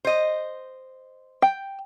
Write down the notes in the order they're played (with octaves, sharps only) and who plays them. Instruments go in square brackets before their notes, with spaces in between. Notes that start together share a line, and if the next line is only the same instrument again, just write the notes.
[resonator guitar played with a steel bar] C5 D#5
[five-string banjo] G5